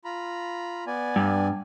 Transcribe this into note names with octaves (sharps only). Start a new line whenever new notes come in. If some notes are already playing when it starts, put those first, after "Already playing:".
F4 A#5 B5
B3 D5 G#5
G2